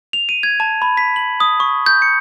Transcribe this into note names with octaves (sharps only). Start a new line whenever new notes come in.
F7
D#7
G#6
A5
B5
B6
F#7
D#6
C#6
G6
C#7